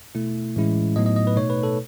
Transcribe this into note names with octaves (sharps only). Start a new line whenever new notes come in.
B2 A3 E4
A2 E3 G#3 C#4 E4
A2 F#3 B3 D#4 D#5
D#5
D#5
B4
B2 A3 D#4 C#5
B4
A4